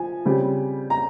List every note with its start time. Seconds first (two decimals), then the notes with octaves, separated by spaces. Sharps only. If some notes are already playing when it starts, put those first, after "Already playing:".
Already playing: F3 G#5
0.25 C#3 G3 C4
0.90 A#5